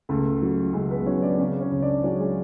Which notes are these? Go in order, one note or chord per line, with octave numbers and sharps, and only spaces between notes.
C#2 A3 A4
F#3
C#2 G#3 G#4
B3 B4
F#3 C#4 C#5
D4 D5
C#3 C#4 C#5
C#4 C#5
C#2
D4 D5
F#3 C#4 C#5
G#3 G#4